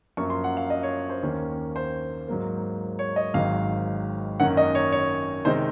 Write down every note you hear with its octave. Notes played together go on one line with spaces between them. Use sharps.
F#2 F3 A#3 C#6
C6
F#5
F5
D#5
C#5
C5
D#2 D#3 A#3 C#4
C5
G#2 F#3 A#3
C#5
D#5
G#1 G#2 D#3 F#3 F5
F#2 D#3 A#3 C#4 F#5
D#5
C#5
C#5
C3 D#3 G#3 D#4 C5